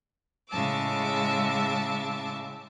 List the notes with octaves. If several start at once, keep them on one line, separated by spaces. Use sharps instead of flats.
A2 C#3 G#3 E5 A5 D6